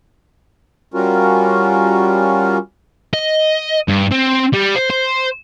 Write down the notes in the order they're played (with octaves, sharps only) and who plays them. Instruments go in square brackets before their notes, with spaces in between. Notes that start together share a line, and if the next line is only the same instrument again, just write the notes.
[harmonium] G3 C#4 F4 F#4 A#4
[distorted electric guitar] D#5
G2
C4
G3
C5
C5